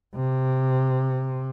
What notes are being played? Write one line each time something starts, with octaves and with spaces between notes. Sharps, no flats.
C3